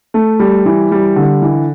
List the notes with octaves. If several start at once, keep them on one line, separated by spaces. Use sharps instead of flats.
A3
G3
E3
G3
D3
E3